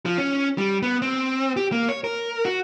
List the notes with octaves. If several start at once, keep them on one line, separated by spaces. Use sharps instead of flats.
F3
C#4
G3
B3
C4
G4
A#3
C#5
A#4
F#4